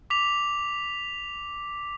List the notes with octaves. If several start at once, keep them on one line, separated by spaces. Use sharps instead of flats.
D6 B6 F7